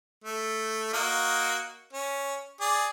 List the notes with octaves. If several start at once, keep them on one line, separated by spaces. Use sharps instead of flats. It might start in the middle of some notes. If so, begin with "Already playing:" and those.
A3
A#3 F#4 D#5
C#4
G#4 D5